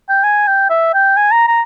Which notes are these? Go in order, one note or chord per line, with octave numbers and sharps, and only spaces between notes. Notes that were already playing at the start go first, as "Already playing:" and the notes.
G5
G#5
G5
E5
G5
G#5
A#5
A#5